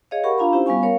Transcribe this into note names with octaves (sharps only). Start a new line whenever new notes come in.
G#4 C#5 D#5 F5
G4 A#4 F#5 B5 C#6
D4 F4 F5 A#5 B5
C#4 E4 G4 C5
G3 B3 F5 G#5 C#6
A#4 C#5 F5